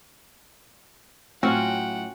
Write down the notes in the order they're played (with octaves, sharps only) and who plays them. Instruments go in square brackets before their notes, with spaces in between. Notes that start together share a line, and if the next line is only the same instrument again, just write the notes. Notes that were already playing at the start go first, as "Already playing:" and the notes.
[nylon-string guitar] A2 F#3 [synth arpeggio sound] C4 [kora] C#4 F4 F#4 [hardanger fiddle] F#5 G5